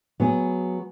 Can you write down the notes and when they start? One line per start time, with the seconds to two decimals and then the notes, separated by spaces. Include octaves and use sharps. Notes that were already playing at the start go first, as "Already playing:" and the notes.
0.20 F#3 B3 G#4